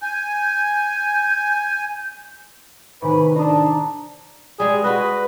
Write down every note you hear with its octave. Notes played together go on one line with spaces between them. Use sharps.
G#5 G6
A2 C3 D#3 B4 G#5 B5
D4 A5 A#5 D#6
G3 G#3 G#4
G#3 F#4 B4 D#5